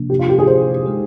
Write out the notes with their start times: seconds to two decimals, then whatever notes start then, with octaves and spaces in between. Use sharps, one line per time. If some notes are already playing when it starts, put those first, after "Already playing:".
Already playing: C3 F3 A#3 D4
0.10 G4
0.19 F4
0.29 G4
0.39 G#4
0.47 C5
0.86 G#3 D#4 G#4 C5